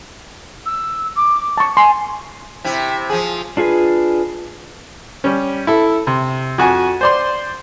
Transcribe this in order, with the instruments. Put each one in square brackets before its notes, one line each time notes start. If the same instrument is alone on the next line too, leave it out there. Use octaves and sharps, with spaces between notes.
[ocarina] E6
D6
[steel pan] A5 C#6
[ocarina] G#5 [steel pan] C6
[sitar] C3 E4
F3 G#4
[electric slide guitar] D4 F4 G#4 A4 B4
[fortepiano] G3 C#4
E4 A4
C3
F2 F#4 G#5
C5 D5 C6